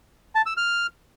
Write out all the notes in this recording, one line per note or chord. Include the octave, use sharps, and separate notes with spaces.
A5
E6
F6